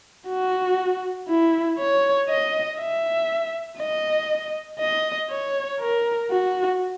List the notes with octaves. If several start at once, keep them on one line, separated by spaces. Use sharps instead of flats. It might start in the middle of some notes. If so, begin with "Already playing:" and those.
F#4
E4
C#5
D#5
E5
D#5
D#5
C#5
A#4
F#4